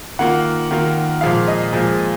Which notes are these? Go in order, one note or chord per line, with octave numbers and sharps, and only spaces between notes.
D#3 A#3 F4 F#5
D#3 A#3 F4
A#2 F3 G#3 F5
D#5
A#2 F3 G#3